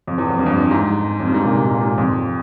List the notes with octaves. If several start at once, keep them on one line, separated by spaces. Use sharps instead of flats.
F2
E2
F2
G2
F2
G2
G#2
F2
G2
G#2
C3
A#2
A#2
G#2
A#2
G#2
F2